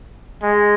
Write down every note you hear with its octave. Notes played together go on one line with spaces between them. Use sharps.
G#3